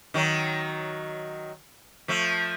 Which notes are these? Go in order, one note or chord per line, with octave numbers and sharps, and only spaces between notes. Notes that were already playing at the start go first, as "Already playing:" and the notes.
D#3 F#3
F3 A3